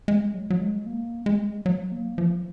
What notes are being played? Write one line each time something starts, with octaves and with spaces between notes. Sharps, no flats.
G#3
F#3
F#3
G#3
A#3
G#3
F#3
A#3
F3